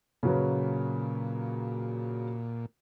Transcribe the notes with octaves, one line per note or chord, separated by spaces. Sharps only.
A#2 C#3 F#3 B4